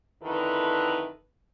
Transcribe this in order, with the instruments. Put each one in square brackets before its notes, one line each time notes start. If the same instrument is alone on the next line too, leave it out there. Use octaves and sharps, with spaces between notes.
[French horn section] F2 D3 D#3 E4 A4 B4